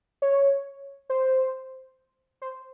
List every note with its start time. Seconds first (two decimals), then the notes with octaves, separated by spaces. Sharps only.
0.22 C#5
1.10 C5
2.42 C5